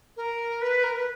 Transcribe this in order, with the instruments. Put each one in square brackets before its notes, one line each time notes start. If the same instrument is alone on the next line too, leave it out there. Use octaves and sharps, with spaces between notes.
[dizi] A#4
B4
A#4
B4